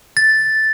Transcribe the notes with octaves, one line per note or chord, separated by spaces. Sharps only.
A6